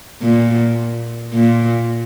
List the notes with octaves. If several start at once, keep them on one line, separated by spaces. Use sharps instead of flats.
A#2
A#2